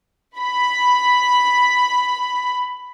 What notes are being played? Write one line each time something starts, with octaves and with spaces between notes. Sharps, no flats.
B5 B6